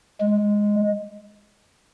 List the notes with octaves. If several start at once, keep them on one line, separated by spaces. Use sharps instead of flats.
G#3